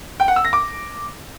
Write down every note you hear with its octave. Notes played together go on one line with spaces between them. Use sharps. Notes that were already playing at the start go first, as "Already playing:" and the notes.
G5
F#5
E6
A#6
D6